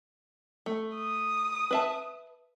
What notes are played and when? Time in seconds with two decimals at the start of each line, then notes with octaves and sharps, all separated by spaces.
0.66 A3
0.97 D#6
1.71 B4 E5 A5